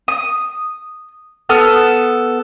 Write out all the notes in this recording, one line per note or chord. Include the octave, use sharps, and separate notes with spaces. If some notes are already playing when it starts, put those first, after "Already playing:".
D#6
B3 A4 F6